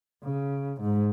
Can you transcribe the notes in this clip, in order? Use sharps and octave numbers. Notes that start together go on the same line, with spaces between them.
C#3
G#2